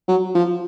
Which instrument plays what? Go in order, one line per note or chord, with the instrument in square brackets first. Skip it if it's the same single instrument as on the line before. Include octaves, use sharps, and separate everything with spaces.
[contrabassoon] F#3
F3